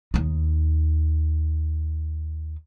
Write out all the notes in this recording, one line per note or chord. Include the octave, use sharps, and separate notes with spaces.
D#2 D#4